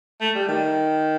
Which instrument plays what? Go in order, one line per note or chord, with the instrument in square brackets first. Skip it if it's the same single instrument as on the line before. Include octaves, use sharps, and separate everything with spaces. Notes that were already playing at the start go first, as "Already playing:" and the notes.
[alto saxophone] A3
G3
D#3